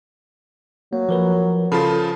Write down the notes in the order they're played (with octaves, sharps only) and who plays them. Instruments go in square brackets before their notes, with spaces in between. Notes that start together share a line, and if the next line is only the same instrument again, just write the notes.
[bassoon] F#3 [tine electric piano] A#3
[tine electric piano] F3 A#4 B4
[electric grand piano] C#3 F3 F4 [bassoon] A4 [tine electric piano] B5